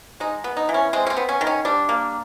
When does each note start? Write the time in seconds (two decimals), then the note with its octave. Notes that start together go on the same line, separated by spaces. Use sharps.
0.20 G#3 D#4
0.44 B3
0.57 D#4
0.69 E3
0.74 C#4
0.93 G#3 C4
1.06 C#4
1.10 C4
1.17 B3
1.29 C#4
1.41 D#3
1.47 C#4
1.65 G3 D4
1.89 A#3